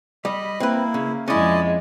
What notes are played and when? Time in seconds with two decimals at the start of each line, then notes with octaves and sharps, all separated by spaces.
0.25 G3 D#5 B5
0.60 A#3 C4 E4 B4
0.94 C#3
1.28 F2 G#3 C#4 E4 G#4 D5 D#5